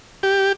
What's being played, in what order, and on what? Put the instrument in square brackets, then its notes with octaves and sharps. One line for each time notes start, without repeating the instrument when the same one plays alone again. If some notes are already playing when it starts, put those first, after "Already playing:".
[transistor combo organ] G4